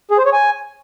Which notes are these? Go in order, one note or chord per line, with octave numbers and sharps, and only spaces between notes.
G#4
C5
C#5
G#5